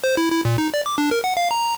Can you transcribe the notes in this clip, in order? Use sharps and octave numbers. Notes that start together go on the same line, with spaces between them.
C5
E4
E4
A#2
D#4
D5
D6
D4
A#4
F#5
F5
A#5